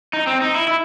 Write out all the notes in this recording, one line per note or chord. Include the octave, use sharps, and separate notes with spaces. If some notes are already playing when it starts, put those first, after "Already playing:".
D#4
C4
D#4
E4
E4